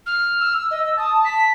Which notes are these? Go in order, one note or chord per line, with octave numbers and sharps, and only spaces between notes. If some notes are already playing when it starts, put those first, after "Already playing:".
F6
E6
D#5
A5 D#6
B6